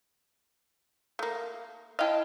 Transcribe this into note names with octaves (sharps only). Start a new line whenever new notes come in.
A3 A#3
E4 D#5 F5 G5 A5